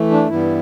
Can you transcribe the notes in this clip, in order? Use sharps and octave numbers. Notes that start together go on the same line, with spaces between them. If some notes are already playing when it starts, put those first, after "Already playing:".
Already playing: E3 A3
D4
G2 E3 G3 B3 E4